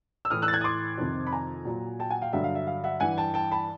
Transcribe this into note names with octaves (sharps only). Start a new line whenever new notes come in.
E6
A2 E3 D#6 F6
E6 F#6
A6
F#6 G#6
D#6
C6 D6
F2 C3 D#3
B5
G#5 A#5
A#2 F#3
G5 A5
F#5 G#5
F5 G5
G2 D3 F#3 E5 F#5
F5
E5
F5
E5 F#5
G2 E3 F#5 G#5
G5 A5
G5 A5
A5 B5